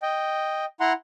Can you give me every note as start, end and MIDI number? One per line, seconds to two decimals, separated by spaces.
0.02 0.65 75
0.02 0.65 79
0.80 0.93 64
0.80 0.93 78
0.80 0.93 82
0.80 0.93 84